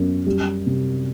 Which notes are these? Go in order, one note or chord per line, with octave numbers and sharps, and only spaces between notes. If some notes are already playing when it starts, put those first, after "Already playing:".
Already playing: F#2 B3
G3
C3